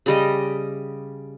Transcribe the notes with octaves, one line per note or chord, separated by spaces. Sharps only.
C#3 G3 D#5